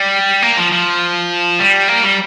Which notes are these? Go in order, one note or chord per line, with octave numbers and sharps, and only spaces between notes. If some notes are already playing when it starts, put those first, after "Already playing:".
Already playing: G3
A#3
F3
F3
G3
A#3
G3